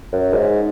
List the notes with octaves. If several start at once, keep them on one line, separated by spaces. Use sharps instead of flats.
F#2
G#2